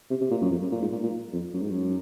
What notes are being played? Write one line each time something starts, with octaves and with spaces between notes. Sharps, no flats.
C3
C3
A#2
F#2
F2
F#2
A#2
G#2
A#2
A#2
F2
F#2
G#2
F#2